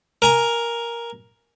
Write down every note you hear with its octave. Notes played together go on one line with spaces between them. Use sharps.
A#4 G#5 A#5